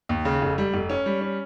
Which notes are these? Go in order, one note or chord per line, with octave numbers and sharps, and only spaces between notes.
D#2
C#3
F1
G3
F1
C#4
G3
C#4